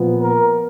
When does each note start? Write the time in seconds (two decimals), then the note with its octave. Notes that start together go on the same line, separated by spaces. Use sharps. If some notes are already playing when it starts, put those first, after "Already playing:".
Already playing: A#2 F3 B3
0.19 A#4